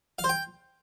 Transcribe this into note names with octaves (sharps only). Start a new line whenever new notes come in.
F5
C5
G5